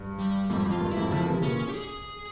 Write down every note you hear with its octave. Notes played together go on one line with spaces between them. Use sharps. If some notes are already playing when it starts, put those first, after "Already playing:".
Already playing: G2
G3
F2 G#2 G3
F2
F4
G2
E4
F2 G#2
C#3 F3 E4
F3
C3 E3
A#2 C#3 C#4
G4
G#4